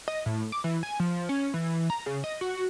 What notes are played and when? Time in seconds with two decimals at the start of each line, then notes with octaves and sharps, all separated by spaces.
0.08 D#5
0.26 A2
0.52 D6
0.64 E3
0.83 G#5
1.00 F3
1.29 C#4
1.54 E3
1.90 A#5
2.06 C#3
2.24 D#5
2.41 F#4